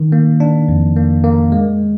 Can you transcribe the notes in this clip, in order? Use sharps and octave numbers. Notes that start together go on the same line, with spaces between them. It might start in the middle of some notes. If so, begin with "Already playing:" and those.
Already playing: D#3
A#3
D4
F2
A#3
A#3
G#3